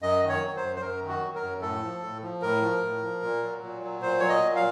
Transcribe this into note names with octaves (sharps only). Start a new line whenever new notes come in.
F#2 D#5
D#3
C#5
F#3
C5
F#2
C5
F#2 A#4
D#3
F#4
F#3
A#4
F#2
A2 A4
F3
A2
F3
A2 A#4
F3
A2
F3
A#2
F#3
A#2
F#3
A#2 C5
F#3 C#5
D#5
A#2
F5